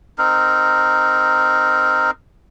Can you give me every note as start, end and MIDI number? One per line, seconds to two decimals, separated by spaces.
0.18 2.11 60
0.18 2.11 63
0.18 2.11 70